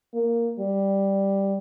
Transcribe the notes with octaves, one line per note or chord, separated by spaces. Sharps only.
A#3
G3